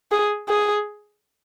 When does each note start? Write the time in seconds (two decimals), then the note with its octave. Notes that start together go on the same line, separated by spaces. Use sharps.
0.12 G#4
0.49 G#4